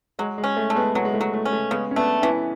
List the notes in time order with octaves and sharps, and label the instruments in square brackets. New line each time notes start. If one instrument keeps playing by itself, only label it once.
[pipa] F#3 [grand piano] G#3
[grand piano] G#3
[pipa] C#4
[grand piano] A3
[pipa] A3
[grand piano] G#3 B3
[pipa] F#3 [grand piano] G#3 B3
[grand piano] G#3
A3
[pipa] F#3
[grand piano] A3
[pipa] C#4
[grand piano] A3
[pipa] C#3 [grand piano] G#3 B3
[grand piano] C#4
[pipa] A3 [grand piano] B3 D4
[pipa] E3 [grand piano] C#4 E4